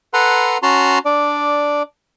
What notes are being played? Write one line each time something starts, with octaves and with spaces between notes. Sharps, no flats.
A4 B4 F#5 A#5 C6
C#4 F#4 A5 A#5 C6
D4 D5